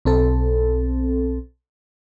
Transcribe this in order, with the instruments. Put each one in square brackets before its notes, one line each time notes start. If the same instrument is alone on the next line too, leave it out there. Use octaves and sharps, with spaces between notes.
[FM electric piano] B1 C4 A4